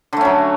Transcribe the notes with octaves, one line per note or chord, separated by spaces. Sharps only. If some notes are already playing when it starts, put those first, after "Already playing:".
D3 F#3 A3 C#4